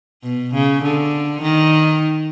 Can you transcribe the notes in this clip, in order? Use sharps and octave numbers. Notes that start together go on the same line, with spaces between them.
B2
C#3
D3
D#3